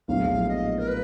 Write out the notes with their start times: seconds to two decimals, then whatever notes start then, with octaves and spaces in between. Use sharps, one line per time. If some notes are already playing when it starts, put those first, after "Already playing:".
0.08 A#1 A2 F#3 B3 F5
0.48 D#5
0.78 A#4
0.87 B4